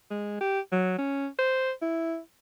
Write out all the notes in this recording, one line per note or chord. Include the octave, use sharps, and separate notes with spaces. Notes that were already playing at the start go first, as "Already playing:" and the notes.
G#3
G4
F#3
C#4
C5
E4